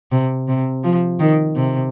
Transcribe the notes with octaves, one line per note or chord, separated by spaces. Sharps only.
C3
C3
F3
D#3
C3